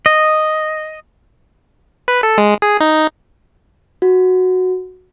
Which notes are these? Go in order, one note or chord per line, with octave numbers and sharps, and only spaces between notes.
D#5
B4
A4
G#3
G#4
D#4
F#4